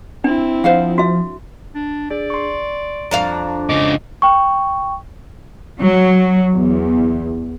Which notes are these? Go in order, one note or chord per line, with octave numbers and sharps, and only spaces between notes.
C4 D4 E4
F3 C5 F5 F#5
F#4 E5
D4
D4 G#4 D5
C6 C#6
F2 D4 F5 A#5
G#2 C#3 D#5 D6
G5 C#6
F#3
E2